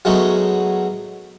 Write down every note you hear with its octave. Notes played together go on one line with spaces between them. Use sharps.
F#3 G#3 A3 B3 C#4 D#4